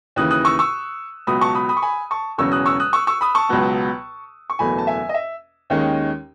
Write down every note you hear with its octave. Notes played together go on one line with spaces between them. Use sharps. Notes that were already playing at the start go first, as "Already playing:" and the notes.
D#2 C#3 E3 D#6 F#6
D#6 F#6
C#6 E6
C#6 E6
C#2 B2 F#3 B5 D#6
A5 C#6
B5 D#6
B5 D#6
C#6
G#5 B5
A5 C#6
E1 E2 C#3 F#3 C#4 C#6 E6
D#6 F#6
C#6 E6
D#6 F#6
C#6 E6
C#6 E6
B5 D#6
A5 C#6
C#2 B2 F#3 B3
C#6
F#1 E2 B2 A3 G#5 B5
A5
E5 G#5
D#5
E5
D#2 D#3 G#3 C#4